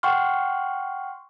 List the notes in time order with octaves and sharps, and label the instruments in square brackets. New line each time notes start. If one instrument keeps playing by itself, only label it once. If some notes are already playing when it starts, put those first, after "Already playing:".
[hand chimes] F#5 G5 C6 C#6 F6